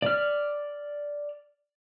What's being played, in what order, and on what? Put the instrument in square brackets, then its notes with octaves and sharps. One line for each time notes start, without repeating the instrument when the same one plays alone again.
[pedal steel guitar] D5 F6